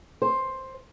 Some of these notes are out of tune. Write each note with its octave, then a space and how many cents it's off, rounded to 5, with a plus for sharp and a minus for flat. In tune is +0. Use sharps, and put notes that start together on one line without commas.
C5 +10